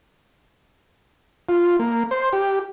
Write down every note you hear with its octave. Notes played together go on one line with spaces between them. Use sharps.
F4
A#3
C5
G4